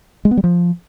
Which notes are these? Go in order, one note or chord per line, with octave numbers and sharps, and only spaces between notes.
G#3
B3
G3
F3